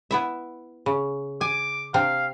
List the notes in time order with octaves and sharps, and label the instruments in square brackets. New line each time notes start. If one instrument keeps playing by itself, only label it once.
[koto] B3 E4 E5
C#3
[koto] G#5 [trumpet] D6
[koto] C3 C4 D4 [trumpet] F5